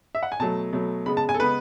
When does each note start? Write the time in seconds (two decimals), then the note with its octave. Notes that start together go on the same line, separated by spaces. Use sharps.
0.15 E5
0.23 F#5
0.32 G#5
0.40 B2 F#3 A3 A5
0.73 B2 F#3 A3
1.06 C#3 G#3 B3 B5
1.17 A5
1.29 G#5
1.34 A4
1.39 C#3 G#3 B3 B4